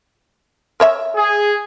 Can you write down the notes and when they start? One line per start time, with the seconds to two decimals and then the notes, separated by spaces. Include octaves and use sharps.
0.80 A#4 C#5 E5
1.15 G#4